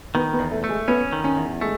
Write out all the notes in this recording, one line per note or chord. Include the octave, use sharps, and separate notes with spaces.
D#3 B3
B3
E2
A3
A3
G#3
B3 C#4
D#3
C#4
E2
G#3 A3